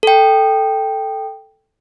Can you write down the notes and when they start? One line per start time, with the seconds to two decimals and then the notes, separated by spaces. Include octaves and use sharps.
0.03 A4 G5